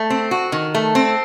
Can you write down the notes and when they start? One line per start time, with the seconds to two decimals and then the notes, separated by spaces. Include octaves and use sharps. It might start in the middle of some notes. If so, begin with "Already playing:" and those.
Already playing: A3
0.10 C4
0.31 F#4
0.52 D#3
0.75 A3
0.95 C4